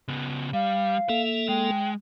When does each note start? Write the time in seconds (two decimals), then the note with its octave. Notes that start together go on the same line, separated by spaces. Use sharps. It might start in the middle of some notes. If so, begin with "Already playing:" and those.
0.08 C#3 B3
0.53 G3 F5
1.09 A#3 A4 E5
1.48 G#3 G5